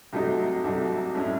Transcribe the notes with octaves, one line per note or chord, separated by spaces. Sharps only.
C2 C3 F#3 A3 D#4
C2 C3 F#3 A3 D#4
A2 G#3 C#4 E4